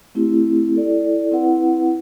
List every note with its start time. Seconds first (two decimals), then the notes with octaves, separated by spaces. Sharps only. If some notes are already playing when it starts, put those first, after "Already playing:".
0.15 A3 C4 E4 G4
0.74 E4 A4 D5
1.32 C4 E4 B4 F#5